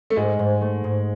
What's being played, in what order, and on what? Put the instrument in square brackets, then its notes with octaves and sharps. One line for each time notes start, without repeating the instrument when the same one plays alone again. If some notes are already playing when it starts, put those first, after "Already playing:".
[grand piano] A3
[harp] G#2 [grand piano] G#3
[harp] G#2
A3
G#2